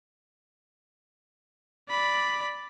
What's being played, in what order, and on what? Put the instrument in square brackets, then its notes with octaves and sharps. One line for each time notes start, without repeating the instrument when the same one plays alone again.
[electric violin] D5 B5